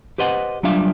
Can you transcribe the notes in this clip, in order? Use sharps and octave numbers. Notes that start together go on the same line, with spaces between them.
G4 B4 C5 D#5 F#5
F#3 G3 D4 F4 E5 F5